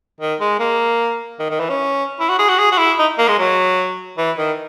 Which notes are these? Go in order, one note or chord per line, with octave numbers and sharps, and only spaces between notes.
D#3
G#3
A#3
D#3
D#3
E3
C#4
E4
F#4
G#4
F#4
G#4
F#4
E4
D#4
A#3
G#3
F#3
E3
D#3